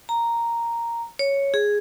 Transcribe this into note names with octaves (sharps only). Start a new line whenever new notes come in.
A#5
C#5
G#4